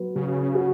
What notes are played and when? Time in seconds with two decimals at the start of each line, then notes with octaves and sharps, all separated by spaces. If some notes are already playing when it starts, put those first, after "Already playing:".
Already playing: F#3 B3
0.15 C#3 F#3
0.55 F#4